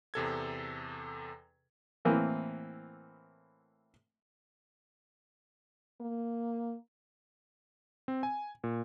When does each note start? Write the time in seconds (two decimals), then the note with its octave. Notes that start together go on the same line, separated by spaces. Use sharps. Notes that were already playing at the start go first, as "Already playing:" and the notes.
0.14 E2 C3 A4 G#6
2.05 A2 E3 A#3 C4
6.01 A#3
8.08 C4
8.23 G#5
8.64 A#2